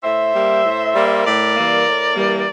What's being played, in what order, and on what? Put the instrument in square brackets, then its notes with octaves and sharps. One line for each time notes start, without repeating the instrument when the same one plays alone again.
[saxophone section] A2 C5 E5
G3 A#3
A2
G3 A#3
A2 A#4 D5
E3 G3 A#3
A2
E3 G3 A#3